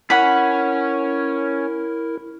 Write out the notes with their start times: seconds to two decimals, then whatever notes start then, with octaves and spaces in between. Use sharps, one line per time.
0.10 C#4 E4 A#4 F#5 B5